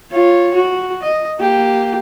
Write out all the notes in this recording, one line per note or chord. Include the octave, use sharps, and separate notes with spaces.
F4 C#5
F#4
D#5
A#3 G4